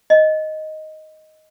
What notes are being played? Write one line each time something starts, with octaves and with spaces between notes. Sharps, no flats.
D#5